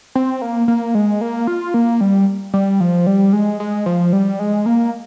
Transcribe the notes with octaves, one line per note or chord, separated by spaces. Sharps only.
C4
A#3
A#3
G#3
A#3
F4
A#3
G3
G3
F3
G3
G#3
G#3
F3
G3
G#3
A#3